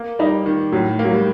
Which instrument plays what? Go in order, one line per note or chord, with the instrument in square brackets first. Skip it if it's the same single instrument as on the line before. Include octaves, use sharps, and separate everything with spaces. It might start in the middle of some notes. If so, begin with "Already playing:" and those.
Already playing: [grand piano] A#3
[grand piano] G3 [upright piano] D#4
[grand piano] D#3
[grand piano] A2 [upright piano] F#3
[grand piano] A#3
[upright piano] F#3
G3